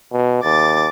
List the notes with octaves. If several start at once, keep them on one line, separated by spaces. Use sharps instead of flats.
B2
D#2 D6 A6